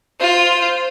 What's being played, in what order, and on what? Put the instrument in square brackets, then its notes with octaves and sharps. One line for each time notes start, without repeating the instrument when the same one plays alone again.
[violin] F4 [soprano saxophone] C5